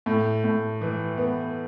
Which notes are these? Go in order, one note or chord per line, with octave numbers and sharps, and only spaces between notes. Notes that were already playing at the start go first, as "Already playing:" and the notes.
A2
A2
E3
B3